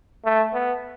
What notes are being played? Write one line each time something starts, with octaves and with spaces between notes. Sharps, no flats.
A3
B3